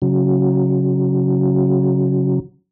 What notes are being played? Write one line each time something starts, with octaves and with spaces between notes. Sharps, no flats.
C#3 F#3